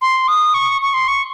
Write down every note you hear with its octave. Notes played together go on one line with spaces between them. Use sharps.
C6
D#6
C#6
C#6
C6
C#6